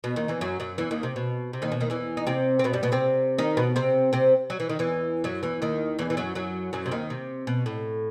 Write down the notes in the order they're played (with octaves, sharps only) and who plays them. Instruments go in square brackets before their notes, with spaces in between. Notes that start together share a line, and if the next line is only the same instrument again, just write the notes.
[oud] B2
D#2 D#3
E2 E3
F#2 F#3
F#2 F#3
E2 E3
D#2 D#3
C3
B2
C3
D#2 D#3
B2
D#2 D#3
E2 E3
D#4
C3 C4
C4
B2 B3
G2 G3
B2 B3
C3 C4
D#3 D#4
B2 B3
C3 C4
C3 C4
F#3
E3
D#3
E2 E3
F#2 F#3
E2 E3
D#2 D#3
E2 E3
E3
F#2 F#3
F#2 F#3
F#2 F#3
C3
D#2 D#3
C3
B2
A2